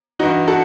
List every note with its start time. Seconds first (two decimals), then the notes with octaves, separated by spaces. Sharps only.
0.19 G2 E3 D#4 F#4
0.48 F#4 A4